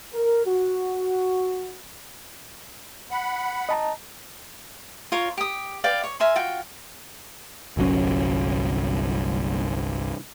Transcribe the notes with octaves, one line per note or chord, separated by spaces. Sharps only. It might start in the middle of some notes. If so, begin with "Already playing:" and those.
A#4
F#4
F#5 B5
D#5 A5 A#5
F4 A#4 C#5
G4 D#6
B4 D5 F5 G5
C#5
A#4 E5 G#5 C6
F4 F#4 G5
G1 C2 F#3 C#4